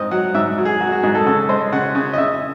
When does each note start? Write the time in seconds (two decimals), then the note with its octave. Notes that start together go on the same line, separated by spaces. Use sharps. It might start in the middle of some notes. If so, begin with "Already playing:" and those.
Already playing: G#2 C4 D#5
0.11 F#3 F#5
0.34 G#2 E5
0.58 F#3
0.65 G#4
0.80 F#3 F#4
0.92 F#4
1.03 G#2 G#4
1.15 A4
1.26 C#3 A4
1.49 G#3 C5
1.72 C#3 F#5
1.95 C#3
2.13 D#5
2.18 C#3 E5